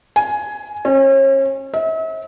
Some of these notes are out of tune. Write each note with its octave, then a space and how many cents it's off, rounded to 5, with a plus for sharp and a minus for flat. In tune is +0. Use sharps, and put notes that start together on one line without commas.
G#5 +10
C#4 -35
E5 -40